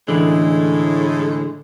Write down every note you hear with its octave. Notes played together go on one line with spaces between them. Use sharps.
A2 D3 E3 G#3